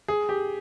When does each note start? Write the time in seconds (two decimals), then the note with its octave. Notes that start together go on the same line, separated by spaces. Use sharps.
0.08 G#4
0.29 G4